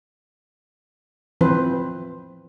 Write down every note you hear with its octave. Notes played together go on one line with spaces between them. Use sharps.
E3 F3 C4 B4 C5